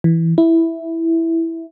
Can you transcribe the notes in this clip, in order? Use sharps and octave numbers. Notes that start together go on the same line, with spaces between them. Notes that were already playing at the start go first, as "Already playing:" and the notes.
E3
E4